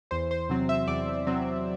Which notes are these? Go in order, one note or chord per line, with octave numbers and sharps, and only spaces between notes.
E2 C5
C5
C3 F#3 C4
E5
E2 D5
C3 F#3 C4